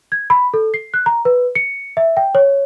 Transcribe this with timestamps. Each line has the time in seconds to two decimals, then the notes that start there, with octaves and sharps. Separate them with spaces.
0.12 G#6
0.30 B5
0.54 A4
0.74 C7
0.94 F#6
1.06 A#5
1.25 B4
1.55 C#7
1.97 E5
2.17 G5
2.35 C#5